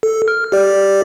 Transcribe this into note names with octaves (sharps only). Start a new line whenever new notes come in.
A4
F6
G4 D5